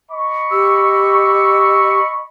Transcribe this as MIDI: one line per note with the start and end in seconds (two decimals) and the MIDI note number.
0.11 2.28 75
0.11 2.28 83
0.11 2.28 85
0.52 2.00 67
0.52 2.19 88